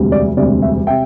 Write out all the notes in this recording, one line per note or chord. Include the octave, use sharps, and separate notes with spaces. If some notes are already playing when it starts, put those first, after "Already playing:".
Already playing: E1 D2 C3 G3
D5
E1 D2 C3 G3 D5
E5
C3 E5 G5